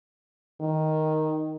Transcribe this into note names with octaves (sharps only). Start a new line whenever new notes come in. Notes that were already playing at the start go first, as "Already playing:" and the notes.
D#3